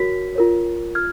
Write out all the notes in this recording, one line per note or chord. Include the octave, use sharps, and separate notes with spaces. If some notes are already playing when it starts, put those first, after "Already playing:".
Already playing: F#4 A#4 C#5 B6
F4 A#4 C#5
F4 F6 G#6